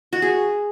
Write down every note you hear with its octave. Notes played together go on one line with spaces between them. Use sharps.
F#4
G#4